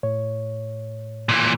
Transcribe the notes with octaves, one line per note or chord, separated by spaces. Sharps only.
A2 C#5
A#2 E3